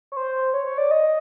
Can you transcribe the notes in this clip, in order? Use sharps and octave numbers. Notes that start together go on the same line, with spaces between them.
C#5
C5
C#5
C#5
D5
D#5